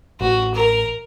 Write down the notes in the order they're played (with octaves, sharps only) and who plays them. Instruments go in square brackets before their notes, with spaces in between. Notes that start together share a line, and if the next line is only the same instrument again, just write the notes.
[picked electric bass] A1 [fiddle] F#4
[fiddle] A#4